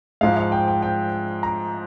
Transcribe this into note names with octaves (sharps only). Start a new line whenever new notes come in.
G#2 F3 G#3 F5
F5
G5
G5
G5
A#5